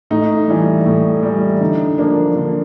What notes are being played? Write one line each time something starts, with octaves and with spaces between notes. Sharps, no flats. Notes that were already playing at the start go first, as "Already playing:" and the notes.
A2 D#4
E3 G3
A2
E3 G3
D3 D#4
F3 A#3 D4
D3